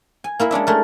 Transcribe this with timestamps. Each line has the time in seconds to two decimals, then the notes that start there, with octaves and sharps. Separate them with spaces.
0.24 G#5
0.39 A#3 E4 E5
0.51 G#3 C#4 D4 E5
0.67 G#3 A3 A#4